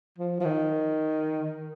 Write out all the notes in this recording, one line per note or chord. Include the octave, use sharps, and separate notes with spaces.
F3
F3
D#3